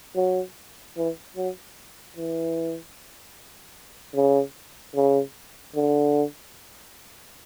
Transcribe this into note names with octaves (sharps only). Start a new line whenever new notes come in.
F#3
E3
F#3
E3
C#3
C#3
D3